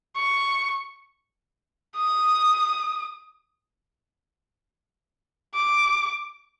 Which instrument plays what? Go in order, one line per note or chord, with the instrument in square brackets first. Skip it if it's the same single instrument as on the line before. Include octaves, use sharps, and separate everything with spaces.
[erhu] C#6
D#6
D6